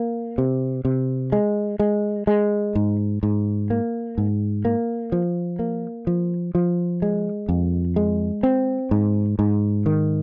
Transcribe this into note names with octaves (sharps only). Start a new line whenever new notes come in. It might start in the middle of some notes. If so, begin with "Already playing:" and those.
Already playing: A#3
C3
C3
G#3
G#3
G#3
G#2
G#2
A#3
G#2
A#3
F3
A#3
F3
F3
G#3
F2
G#3
C4
G#2
G#2
D#3